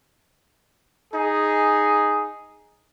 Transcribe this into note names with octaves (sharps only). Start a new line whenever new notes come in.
D#4 G#4